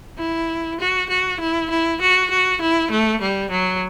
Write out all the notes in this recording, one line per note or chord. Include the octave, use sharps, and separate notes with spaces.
E4
F#4
F#4
E4
E4
F#4
F#4
E4
A3
G3
F#3